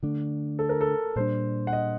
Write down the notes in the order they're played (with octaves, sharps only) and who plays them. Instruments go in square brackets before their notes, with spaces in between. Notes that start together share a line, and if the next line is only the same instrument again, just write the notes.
[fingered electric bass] D3 A3 D4
[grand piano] A4
A#4
A4
[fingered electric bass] A#2 G3 D4 [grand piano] C5
[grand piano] F#5
D#5